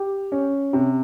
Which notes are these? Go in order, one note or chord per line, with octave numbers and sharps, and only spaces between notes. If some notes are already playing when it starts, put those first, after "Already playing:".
Already playing: G4
C#4
C3